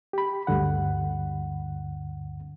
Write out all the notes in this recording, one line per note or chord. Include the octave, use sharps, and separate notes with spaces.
G4 B5
D2 G2 D3 F#5